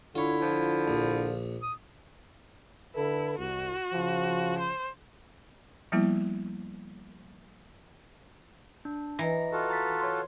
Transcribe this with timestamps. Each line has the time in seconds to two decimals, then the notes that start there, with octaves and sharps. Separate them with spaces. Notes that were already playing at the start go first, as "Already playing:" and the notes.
0.15 D3 E4 F4 C#5
0.42 F3
0.88 A#1
1.62 D#6
2.95 D3 E4 A4 B4
3.38 C2 F#4
3.93 C#3 F3
4.59 C5
5.92 F3 G3 A#3 B3 E4
8.85 D4
9.19 E3 D#5 A#5 A#6
9.52 F4 F#4 A4
9.69 A#5 A6 B6
10.01 C#5 C6